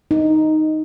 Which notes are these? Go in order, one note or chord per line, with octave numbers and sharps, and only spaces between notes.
D#4